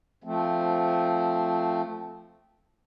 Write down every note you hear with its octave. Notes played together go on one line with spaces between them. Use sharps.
F3 A3 C4